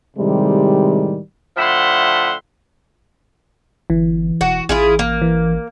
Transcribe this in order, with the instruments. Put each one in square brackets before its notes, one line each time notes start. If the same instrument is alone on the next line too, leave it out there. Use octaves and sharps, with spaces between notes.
[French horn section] A2 C3 D#3 G3 G#3
[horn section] A2 D3 F3 E5 F#5 C6
[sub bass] G1 [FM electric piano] E3
[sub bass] E1 [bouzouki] F#4
[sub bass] A1 [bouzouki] E4 F4 G#4
[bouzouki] A#3
[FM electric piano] E3